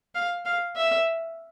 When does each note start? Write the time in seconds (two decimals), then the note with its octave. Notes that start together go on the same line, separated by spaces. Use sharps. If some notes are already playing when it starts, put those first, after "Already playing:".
0.15 F5
0.45 F5
0.76 E5